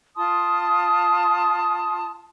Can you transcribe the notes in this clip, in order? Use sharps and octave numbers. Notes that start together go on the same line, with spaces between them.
F4 A5 C6 D#6